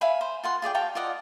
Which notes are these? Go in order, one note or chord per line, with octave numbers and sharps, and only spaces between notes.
E5 F5 G#5 B5
C5
F4 F#5 C6
F4 G#4 D5 G5
F#4 F5 G5 A5
F4 D5 D#5 F#5